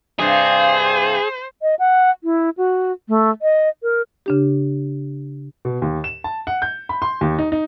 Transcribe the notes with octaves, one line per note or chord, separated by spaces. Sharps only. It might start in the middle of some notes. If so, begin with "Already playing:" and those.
G2 C3 G#4 C5
D#5
F#5
E4
F#4
A3
D#5
A#4
C#3 D4 G4
B2
D#2
E7
A5
F#5
G6
B5
C6
D#2
D#4
D#4